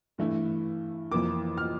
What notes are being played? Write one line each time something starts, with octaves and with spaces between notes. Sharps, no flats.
G2 E3 A3 E4
F2 E3 A#3 D6
F6